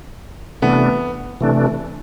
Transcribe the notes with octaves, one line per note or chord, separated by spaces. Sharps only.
C3 E3 A3 B3 D4
C3 E3 A3 D4